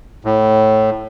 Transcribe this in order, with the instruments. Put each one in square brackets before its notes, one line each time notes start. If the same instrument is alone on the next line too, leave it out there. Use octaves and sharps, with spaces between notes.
[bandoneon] A2